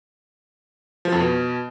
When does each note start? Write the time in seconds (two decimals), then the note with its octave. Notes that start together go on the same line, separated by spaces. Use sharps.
1.05 F3
1.12 F2
1.19 B2